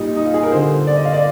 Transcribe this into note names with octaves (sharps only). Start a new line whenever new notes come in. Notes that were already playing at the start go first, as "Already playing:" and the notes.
Already playing: A#2 G3 D#4
D#4
F4
G#4
A#4
D3 G3 C5
D5
D#5
F5
D5